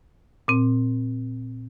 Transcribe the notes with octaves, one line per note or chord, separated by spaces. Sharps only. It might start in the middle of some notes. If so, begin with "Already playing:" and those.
A#2 C4